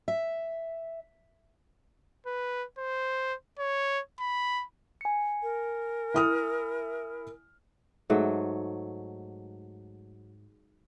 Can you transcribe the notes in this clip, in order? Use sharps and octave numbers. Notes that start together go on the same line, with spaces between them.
E5
B4
C5
C#5
B5
G#5 C#7
A#4
E4 D#6 F6
G#2 F#3 A3